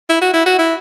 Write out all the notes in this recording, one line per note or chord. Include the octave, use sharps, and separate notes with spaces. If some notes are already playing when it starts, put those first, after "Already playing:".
E4
F#4
E4
F#4
E4